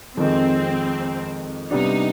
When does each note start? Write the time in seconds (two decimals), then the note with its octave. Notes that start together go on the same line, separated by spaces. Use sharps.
0.17 F2 D#3 G#3 C4
1.71 C3 G3 B3 D4 D#4